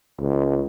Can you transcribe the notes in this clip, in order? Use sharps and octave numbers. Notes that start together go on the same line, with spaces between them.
C#2